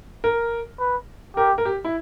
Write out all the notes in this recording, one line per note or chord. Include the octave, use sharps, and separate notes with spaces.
A#4
B4
G4 A#4
A#4
G4
E4